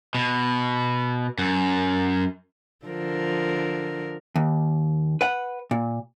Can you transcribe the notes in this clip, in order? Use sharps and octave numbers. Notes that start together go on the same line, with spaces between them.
B2
F#2
D3 F3 A#4
D#2
B4 F#5
A#2